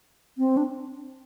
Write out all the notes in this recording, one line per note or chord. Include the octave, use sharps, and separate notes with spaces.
C4
D4